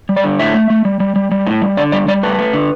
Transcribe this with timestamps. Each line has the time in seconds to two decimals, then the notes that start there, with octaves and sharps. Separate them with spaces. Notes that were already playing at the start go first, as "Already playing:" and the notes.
0.09 G3
0.16 D5
0.24 D3
0.39 A2 E5
0.54 A3
0.70 A3
0.85 G3
1.00 G3
1.16 G3
1.31 G3
1.47 A2
1.62 G3
1.77 D3 D5
1.92 G3 D5
2.08 G3 D5
2.23 A3 B4
2.38 A3
2.53 D3